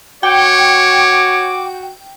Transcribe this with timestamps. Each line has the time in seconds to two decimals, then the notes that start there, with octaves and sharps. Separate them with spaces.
0.23 F#4 C#5 G5 D6